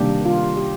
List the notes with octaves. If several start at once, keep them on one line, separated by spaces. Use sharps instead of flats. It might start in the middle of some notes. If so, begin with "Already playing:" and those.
Already playing: C3 D#3 G3 A#3 D4 G4
F4
G4